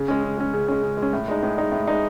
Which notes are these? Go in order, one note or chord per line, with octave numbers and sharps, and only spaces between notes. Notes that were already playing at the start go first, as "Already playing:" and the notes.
Already playing: C#3
G#3 C#4
C#3
G#3 C#4
C#3
G#3 C#4
C#3
G#3
C#4
A2
G#3 D#4
A2
G#3 D#4
A2
G#3 D#4